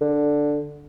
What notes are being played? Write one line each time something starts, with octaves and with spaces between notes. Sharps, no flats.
D3